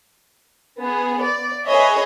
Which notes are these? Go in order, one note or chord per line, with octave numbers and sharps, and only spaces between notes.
B3 G#4
D5
G#4 B4 C#5 D#5 E5